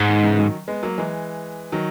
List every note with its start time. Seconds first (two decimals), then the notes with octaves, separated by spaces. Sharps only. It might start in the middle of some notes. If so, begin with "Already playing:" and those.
Already playing: G#2
0.08 D#3
0.23 C#3 E3
0.38 D#3 F#3
0.68 G#3 B3
0.83 F#3 A#3
0.98 E3 G#3
1.72 D#3 F#3